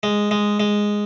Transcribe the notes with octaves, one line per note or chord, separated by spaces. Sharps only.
G#3
G#3
G#3